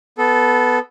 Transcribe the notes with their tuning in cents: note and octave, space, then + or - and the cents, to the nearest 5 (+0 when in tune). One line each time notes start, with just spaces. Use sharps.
B3 +0 A4 -15